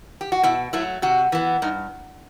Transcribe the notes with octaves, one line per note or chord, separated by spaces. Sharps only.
G4
F#4
B2 E4
F#3 A3 E4
C3 F#4
E3 B3
G2 D#4